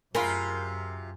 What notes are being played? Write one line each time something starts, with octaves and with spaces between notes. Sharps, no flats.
F#2 C3 F4 G#4 A#4 B5 C6